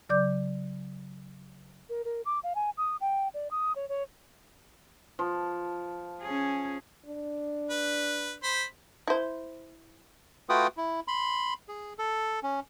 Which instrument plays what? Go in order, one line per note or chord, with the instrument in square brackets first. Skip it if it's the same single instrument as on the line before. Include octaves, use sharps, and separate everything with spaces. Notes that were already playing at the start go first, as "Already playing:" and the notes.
[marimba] C#3 F#3 D5 D6 G6
[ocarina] A#4
A#4
D6
F5
G#5
D#6
G5
D5
D#6
C#5
C#5
[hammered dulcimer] F3
[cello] C#4 G#4
[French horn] D4
[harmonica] B4
C5 B5
[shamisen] E4 C5
[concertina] A3 F4 F#4 B4 G5 D#6
E4
B5 C6
G#4
A4
C#4